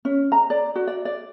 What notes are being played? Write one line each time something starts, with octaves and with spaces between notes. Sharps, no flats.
C#4
A#5
D5
F#4
D5
D5